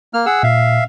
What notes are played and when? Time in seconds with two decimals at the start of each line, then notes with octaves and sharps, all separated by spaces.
0.14 A#3 F6
0.26 G#4 F#5 E6
0.43 A#2 E5 F5